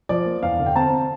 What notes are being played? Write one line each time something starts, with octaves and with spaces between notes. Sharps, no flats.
F3 D5
A#3
E2 F5
D3
G5
C4 A5